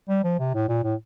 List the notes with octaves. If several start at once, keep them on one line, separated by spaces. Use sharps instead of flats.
G3
F3
C3
A2
A#2
A2